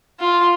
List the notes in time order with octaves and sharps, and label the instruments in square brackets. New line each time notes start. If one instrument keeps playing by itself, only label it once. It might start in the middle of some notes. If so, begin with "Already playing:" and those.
[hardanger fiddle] F4